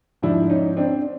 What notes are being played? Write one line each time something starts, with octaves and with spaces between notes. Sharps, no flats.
G#2 F3 D4 E4
C#4 D#4
C4 D4